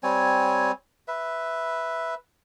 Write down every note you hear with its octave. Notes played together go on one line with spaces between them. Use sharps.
G3 C4 C#5 G#5
B4 E5